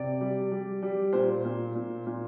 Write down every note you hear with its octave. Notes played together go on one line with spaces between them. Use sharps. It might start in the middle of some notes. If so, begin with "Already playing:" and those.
Already playing: C3 D5
G3
G3
G3
A#2 C5
A#2
A#2
A#2